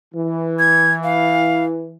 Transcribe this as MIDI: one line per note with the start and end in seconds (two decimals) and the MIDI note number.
0.14 1.96 52
0.59 0.92 92
1.04 1.64 77